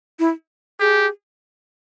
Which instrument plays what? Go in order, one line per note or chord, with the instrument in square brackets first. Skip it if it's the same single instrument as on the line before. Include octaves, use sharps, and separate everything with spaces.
[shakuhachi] E4
[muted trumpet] G4 [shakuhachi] G#4